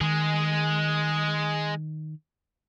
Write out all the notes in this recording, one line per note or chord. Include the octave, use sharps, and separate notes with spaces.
D#3 G#3 G#4